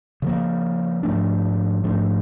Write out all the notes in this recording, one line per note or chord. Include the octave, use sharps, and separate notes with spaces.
C#3 F3 A#3
G#2 F3 A3 D4
G#2 F3 A3 D4